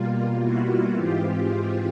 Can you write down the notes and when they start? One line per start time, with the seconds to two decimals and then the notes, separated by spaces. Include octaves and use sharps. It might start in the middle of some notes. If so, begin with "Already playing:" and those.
Already playing: B2 G3 A#3 F4
0.39 E4 F#4
0.93 G#2 E3 G#3 C4 F4 G4
1.47 F4 G4